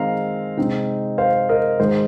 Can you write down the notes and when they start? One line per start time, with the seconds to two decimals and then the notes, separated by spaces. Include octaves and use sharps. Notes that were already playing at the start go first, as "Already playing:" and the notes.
Already playing: D#3 G#3 C4 F5 A#5
0.57 C3 G#3 C4 D#4
1.18 C5 F5
1.49 A#4 D#5
1.79 G#2 D#3 G#3 C5